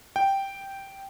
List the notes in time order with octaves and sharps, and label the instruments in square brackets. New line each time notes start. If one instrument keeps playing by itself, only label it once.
[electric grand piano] G5